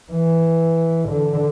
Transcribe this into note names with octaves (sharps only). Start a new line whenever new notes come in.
E3
D3